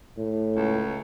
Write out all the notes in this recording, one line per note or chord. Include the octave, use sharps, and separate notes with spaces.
A2
C#2